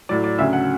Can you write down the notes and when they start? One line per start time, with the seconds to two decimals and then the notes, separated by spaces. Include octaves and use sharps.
0.09 A2 F#3 D5
0.24 D5
0.38 D2 C#3 F#3 E5
0.53 F#5